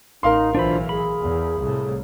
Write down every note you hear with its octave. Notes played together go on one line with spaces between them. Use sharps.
A1 D#4 A#4 F5 C6
B1 E3 D4 F4 C5 B5
G#4 B5
E2
C2 A2